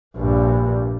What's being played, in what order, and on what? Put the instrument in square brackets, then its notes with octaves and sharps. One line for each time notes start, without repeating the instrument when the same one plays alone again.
[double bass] A#1 G2